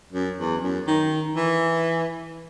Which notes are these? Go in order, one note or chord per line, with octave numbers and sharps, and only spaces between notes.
F#2
E2
F#2
D#3
E3